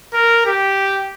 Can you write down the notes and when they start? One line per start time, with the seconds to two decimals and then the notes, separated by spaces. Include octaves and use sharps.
0.14 A#4
0.46 G4